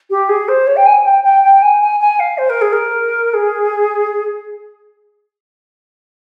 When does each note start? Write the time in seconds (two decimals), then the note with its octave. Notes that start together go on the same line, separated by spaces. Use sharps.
0.10 G4
0.29 G#4
0.48 C5
0.66 C#5
0.76 G5
0.86 G#5
1.05 G5
1.23 G5
1.43 G5
1.62 G#5
1.81 G#5
2.00 G#5
2.19 F5
2.38 C5
2.49 A#4
2.61 G#4
2.72 A#4
3.33 G#4